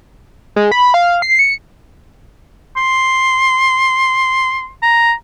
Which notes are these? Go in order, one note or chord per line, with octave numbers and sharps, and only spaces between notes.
G#3
B5
F5
C7
C#7
C6
A#5